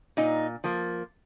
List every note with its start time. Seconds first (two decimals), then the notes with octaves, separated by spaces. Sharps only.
0.17 A#2 D#4
0.64 F3 A#3